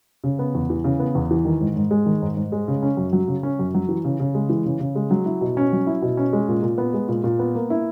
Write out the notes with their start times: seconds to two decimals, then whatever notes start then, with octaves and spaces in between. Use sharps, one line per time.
0.24 C#3
0.39 B3
0.55 E2
0.70 E3
0.84 C#3
1.00 B3
1.15 E2
1.31 E3
1.45 D#3
1.61 G#2
1.76 G#2
1.91 G#3
2.06 D#3
2.22 G#2
2.37 G#2
2.52 G#3
2.68 C#3
2.83 C#4
2.97 F#2
3.13 F#3
3.28 C#3
3.43 C#4
3.59 F#2
3.75 F#3
3.89 E3
4.04 C#3
4.20 C#3
4.35 G#3
4.49 E3
4.66 C#3
4.80 C#3
4.95 G#3
5.11 F#3
5.26 E4
5.41 B2
5.57 C#4
5.72 F#3
5.87 E4
6.02 B2
6.17 C#4
6.33 G#3
6.49 A#2
6.63 A#2
6.78 B3
6.94 G#3
7.08 A#2
7.24 A#2
7.39 B3
7.55 A#3
7.70 E4